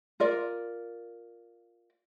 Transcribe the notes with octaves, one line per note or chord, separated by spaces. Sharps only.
F4 A#4 D5